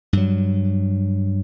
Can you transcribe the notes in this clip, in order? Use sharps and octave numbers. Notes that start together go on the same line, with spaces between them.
G2 F#3